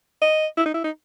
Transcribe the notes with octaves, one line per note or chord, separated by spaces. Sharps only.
D#5
E4
D#4
E4
D#4